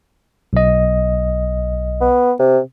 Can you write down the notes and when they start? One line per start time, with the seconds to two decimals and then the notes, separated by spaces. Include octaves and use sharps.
0.53 B1 D#5
2.01 B3
2.39 C3